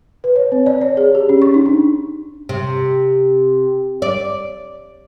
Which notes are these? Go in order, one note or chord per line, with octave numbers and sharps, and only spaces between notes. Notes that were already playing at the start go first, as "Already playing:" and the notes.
B4
C#5
C4
D5
C#5
G#4
G4
C#4
C#6
D#4
D4
C3
D5